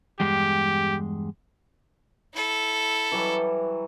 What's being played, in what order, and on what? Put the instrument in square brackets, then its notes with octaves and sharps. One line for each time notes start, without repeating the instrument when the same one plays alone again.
[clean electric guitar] E2 G2 G#3 [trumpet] G4
[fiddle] E4 A4
[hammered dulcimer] E3 F#3 G3